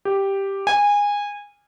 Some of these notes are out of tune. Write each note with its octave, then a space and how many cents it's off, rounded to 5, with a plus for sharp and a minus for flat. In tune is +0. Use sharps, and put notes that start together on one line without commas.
G4 +0
G#5 -20